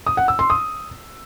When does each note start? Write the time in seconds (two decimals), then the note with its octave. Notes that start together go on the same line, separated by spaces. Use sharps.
0.06 D#6
0.17 F#5
0.28 E6
0.39 C6
0.50 D#6